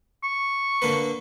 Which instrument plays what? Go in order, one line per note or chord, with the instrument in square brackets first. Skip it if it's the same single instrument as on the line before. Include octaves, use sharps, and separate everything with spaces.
[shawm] C#6
[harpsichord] D3 A#3 B4